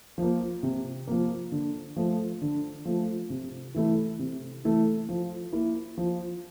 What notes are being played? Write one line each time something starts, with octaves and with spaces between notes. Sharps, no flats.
F3 A#3
C3
F3 A#3
D3
F3 A3
D3
F3 A3
C3
E3 A3 E4
C3
E3 A3 E4
F3
A#3 E4
F3